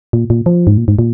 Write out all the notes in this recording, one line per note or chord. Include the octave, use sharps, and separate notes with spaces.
A#2
A#2
F3
G#2
A#2
G#2
A#2